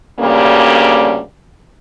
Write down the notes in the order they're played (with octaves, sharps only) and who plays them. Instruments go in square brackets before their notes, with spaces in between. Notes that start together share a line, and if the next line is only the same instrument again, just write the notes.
[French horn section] D2 G2 C#3 G3 A#3